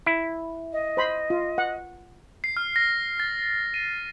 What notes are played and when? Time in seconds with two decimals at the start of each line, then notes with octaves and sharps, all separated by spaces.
0.06 E4
0.73 D#5
0.97 C5 B5 C6
1.30 F4
1.58 F#5
2.44 C7
2.57 F6
2.76 A#6
3.20 A6
3.74 D#7